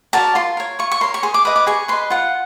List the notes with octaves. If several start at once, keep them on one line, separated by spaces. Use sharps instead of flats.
F#4 A#4 D5 A5
F4 C6
A#4 C#5
F4 C#6
C#6
A#4 C#5 C6
C#6
G#4 C6
D6
B4 D#5 D#6
D6
G#4 C#6
B4 D#5 C6
F4 F#5